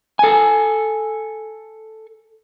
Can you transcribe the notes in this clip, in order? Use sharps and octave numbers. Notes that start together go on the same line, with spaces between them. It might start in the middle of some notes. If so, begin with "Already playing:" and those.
A4 G#5